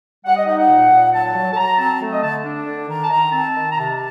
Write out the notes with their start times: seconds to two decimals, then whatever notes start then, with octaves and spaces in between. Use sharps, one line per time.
0.25 G3 F#5
0.35 D#5
0.46 D#4 D#5
0.57 F#5
0.68 A#2
0.91 A#2
1.12 F#3 A5
1.34 F#3
1.52 A5
1.56 F#3 A#5
1.78 C4 A5
2.01 A3
2.11 D#5
2.22 D3 A5
2.44 D4
2.67 D3
2.88 D#3 A#5
3.01 A5
3.10 D#3 A#5
3.32 C4 A5
3.55 D#3
3.71 A#5
3.76 C3 A5